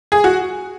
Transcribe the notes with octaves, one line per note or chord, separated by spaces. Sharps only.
G#4
F#4